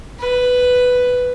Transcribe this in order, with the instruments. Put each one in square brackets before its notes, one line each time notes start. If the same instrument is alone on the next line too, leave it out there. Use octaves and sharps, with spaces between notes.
[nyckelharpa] B4